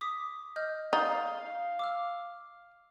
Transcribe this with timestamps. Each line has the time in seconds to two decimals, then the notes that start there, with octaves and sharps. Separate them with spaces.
0.01 D6 D#6 B6
0.56 D#5 F6 G6
0.93 D#4 F5 A6
1.79 D6 E6 F6